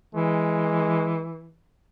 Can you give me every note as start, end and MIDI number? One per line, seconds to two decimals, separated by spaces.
0.15 1.57 52
0.15 1.27 56